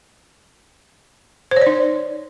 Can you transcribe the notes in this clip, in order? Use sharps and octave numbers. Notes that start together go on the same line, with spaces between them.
C5
C#5
D5
D#4